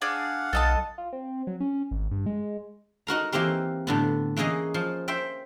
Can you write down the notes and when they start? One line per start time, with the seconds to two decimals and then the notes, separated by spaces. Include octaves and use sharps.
0.02 D4 G#4 D5 F5 F#5
0.53 B1 A4 D#5 A5
0.98 F4
1.13 C4
1.47 F#3
1.60 C#4
1.91 G#1
2.11 G2
2.26 G#3
3.07 D#4 F#4 A#4 A#5
3.32 E3 A#3 C4 G4 A#4
3.87 A2 D3 B3
4.36 E3 A#3 C#4 G#4 D#5
4.74 F3
5.08 C5 E5 G5